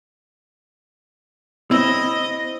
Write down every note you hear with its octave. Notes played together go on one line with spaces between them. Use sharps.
C4 E4 D#5